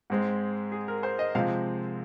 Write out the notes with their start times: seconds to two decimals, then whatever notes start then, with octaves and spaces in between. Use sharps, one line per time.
0.10 G#2 G#3 C4
0.72 G#4
0.88 A#4
1.03 C5
1.19 D#5
1.35 C3 F3 G#3 C4 F5